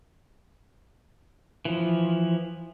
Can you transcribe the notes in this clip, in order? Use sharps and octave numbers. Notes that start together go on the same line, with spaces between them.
E3 F3